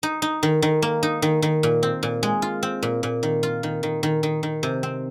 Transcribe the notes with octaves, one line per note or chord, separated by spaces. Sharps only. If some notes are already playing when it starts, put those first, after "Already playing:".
D#4
D#4
D#3
D#3
A#3
D#4
D#3
D#3
A#2
C4
A#2
G#3
F4
C4
A#2
A#2
D#3
F4
D#3
D#3
D#3
D#3
D#3
C3
C4